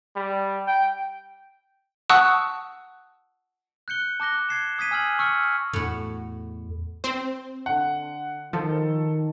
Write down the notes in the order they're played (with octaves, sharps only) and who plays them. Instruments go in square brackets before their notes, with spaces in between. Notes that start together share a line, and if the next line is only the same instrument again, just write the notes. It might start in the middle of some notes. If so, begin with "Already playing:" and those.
[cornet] G3
G5
[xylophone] F#5 A5 C#6 D#6 E6 F#6
[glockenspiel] F#6 G6 C#7 G7
A5 D6 F#6 A#6 G7
G#6 C7 E7
D#6 G#6 B6 D#7
G#5 E6 F6 G#6 F#7
C#6 E6 F6 C#7
[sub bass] E2 [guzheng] A2 F#4
[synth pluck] C4 C5
[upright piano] D3 F#5
[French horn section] D#3 [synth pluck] F3 [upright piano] A4